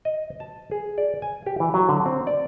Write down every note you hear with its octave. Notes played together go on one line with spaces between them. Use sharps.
D#5
A5
G#4
D5
G#5
G4
E3
F#3
D3
C4
D5